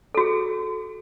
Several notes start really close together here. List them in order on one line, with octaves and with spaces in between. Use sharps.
A4 F#4 G#4